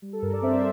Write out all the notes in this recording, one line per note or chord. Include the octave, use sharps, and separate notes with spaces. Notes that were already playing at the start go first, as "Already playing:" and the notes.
G3
A4
G2 A#4
A#4 D5
C4 C5 E5